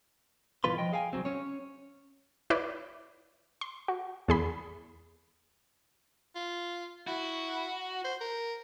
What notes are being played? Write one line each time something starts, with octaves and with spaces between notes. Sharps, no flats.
G2 B2 E3 F4 B4 C6
F3 D#5 G5
G#4 F5 G5 G#5
C2 C#3 F#3 C4
C#4 C#5
E4 B4 C#5 D5
C6
F#4
E2 G#4 B5
F4
E4 F#4
C5
A#4